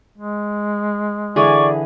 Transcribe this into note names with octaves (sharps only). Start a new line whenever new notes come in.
G#3
D3 E3 G#4 D5 C#6